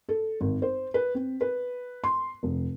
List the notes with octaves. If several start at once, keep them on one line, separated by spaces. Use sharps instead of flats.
A4
G#1
C5
B4
C4
B4
C6
F1